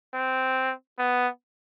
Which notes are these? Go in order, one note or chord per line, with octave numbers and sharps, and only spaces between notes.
C4
B3